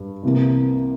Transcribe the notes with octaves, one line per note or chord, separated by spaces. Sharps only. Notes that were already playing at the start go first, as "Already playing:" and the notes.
Already playing: G2
C2 C3 E3 A#3